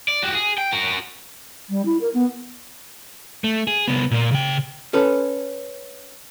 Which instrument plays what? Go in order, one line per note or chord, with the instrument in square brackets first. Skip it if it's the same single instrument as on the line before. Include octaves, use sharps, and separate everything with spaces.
[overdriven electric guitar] D5
F#4 G4
G#4
G5
F#4 A#4
[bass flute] G3
E4
A#4
B3
[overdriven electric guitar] A3
G#4
C2 B3
A#2 A#3
C#3 G5
[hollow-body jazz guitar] C#4 A4 B4